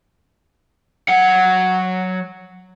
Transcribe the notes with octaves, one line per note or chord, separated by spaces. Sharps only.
F#3 F#5